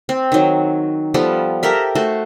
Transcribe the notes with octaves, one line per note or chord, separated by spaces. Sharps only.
C4
D#3 F#3
F3 G3 B3 A4
G4 A4 A#4 E5
A3 F#4 C5